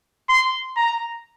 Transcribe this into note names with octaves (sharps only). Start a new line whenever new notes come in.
C6
A#5